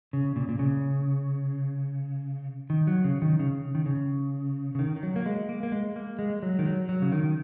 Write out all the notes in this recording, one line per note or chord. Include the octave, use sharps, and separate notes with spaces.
C#3
A#2
A#2
C#3
D#3
F#3
C#3
D#3
C#3
D#3
C#3
C#3
D#3
D#3
F#3
A#3
G#3
A#3
A#3
G#3
A#3
G#3
F#3
D#3
F#3
F#3
C#3
D#3